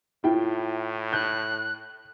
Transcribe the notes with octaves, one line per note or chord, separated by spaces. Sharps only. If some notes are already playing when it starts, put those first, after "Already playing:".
A2 E4 F4 G5
F#6 G6